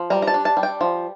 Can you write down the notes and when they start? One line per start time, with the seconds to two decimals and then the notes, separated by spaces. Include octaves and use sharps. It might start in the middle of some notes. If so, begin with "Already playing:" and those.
Already playing: F3
0.10 G3 A#5
0.22 A#5
0.27 A5
0.34 D4
0.45 A5
0.57 G3
0.63 G5
0.81 F3